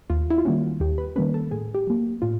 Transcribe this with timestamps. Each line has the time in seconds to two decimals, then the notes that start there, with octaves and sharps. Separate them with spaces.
0.10 D#2 F4
0.31 E4
0.38 F4
0.45 D#3 G3 A#3 C#4 F#4
0.80 D#2 G4
0.98 B4
1.16 D#3 G3 A#3 C#4 B4
1.34 A4
1.51 A2 G#4
1.75 G4
1.87 F#3 A#3
2.22 A2 F4